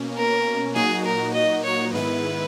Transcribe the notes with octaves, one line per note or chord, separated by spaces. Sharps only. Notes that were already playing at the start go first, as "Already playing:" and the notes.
Already playing: B2 A#3 C#4
A#4
A#2 F#3 A#3 D#4 F#4 G#4
A#4
D#5
C#5
G#2 D#3 G#3 B3 E4 B4